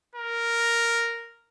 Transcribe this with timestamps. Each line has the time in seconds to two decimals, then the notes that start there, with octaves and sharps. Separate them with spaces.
0.15 A#4